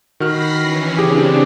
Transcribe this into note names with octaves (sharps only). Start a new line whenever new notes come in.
D#3 F#4 B5 F6 A#6 C7
E3 C#4
C#3 C4 D4 G4 G#4